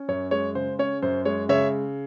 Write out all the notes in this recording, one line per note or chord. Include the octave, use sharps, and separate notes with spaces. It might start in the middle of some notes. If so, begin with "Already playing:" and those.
Already playing: C#4
F#2 C#5
G#3 C#5
C#3 C5
C#4 C#5
F#2 C5
G#3 C#5
C#3 C#5 E5